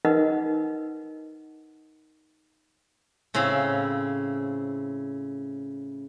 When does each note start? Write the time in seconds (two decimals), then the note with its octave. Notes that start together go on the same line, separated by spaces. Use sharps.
0.05 D#4 A#4 B4 D#5 F#5
3.34 A2 C#3 C4 C#4 F5